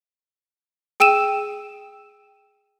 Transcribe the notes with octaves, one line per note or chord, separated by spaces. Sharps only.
G#4 G5 E6 D#7 E7